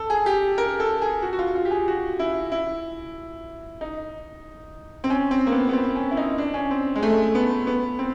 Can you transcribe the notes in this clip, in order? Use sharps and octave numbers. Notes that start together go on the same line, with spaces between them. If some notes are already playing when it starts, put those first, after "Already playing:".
Already playing: A4
G#4
G4
A#4
A4
G#4
F#4
F#4
F4
F4
G4
G#4
F#4
E4
E4
D#4
C4
C#4
C4
A#3
B3
B3
C4
C#4
E4
D#4
D4
C#4
C4
G#3
A3
B3
B3
C4